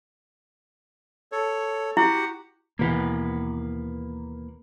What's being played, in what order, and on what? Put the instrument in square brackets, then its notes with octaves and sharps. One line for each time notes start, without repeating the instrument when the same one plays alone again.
[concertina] A4 C#5
[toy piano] E4 [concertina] F#4 G4 F#5
[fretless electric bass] D#2 B2 E3 [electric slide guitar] A#3 B4